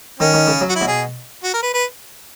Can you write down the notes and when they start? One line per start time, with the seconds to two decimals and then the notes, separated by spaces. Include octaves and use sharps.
0.19 D#3 C#4
0.34 D#3
0.47 C#3
0.61 F#3
0.69 F#4
0.75 E4
0.81 B2
0.88 G#4
1.43 F#4
1.54 A#4
1.63 B4
1.74 B4